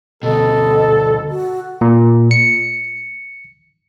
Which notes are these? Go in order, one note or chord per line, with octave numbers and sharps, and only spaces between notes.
D2 B2 A4 D#5
F#4
A#2
C#7